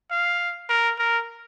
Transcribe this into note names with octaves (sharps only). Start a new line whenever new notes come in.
F5
A#4
A#4